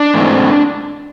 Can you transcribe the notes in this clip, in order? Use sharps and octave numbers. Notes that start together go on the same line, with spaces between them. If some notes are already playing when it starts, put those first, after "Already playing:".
Already playing: D4
G#2 E3 A3 C4